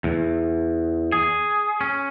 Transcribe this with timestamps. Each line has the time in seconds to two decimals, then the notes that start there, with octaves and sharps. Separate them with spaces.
0.04 E2
1.12 G#4
1.81 C#4